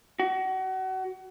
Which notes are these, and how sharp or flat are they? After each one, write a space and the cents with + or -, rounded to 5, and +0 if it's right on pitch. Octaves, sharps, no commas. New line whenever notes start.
F#4 +30